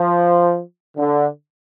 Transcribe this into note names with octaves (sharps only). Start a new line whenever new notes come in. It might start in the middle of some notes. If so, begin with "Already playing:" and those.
Already playing: F3
D3